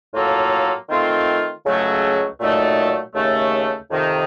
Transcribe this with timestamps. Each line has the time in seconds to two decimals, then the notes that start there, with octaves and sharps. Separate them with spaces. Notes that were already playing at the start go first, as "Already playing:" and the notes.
0.14 A2 F#3 A#3 F4 A4
0.89 D#3 A3 C4 F4
1.64 C#2 C#3 F#3 A3
2.39 A#2 F#3 A3 D#4
3.14 D#2 C#3 A3
3.89 F2 C3 D#3